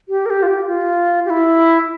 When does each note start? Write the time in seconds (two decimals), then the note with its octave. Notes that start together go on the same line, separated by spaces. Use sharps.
0.09 G4
0.26 A#4
0.30 G4
0.43 F4
0.47 G4
0.67 F4
1.25 G4
1.30 E4